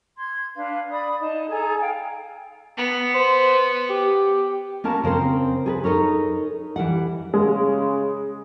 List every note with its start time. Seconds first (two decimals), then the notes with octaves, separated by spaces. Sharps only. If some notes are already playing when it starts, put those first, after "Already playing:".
0.18 C6 G#6
0.56 D4 B4 F5
0.91 D5 B5 D#6
1.20 D#4 A5
1.48 G#4 A4 G#5 A#5
1.81 F5 G5
2.77 B3
3.15 C5
3.90 G4
4.84 A#3 B3 C#4 A#4 A5
5.03 C#3 C4 A#4 C5
5.66 G#4 A4 B4
5.84 D#4 A4 A#4 C#5
6.76 E3 G3 F#5
7.34 C#3 G#3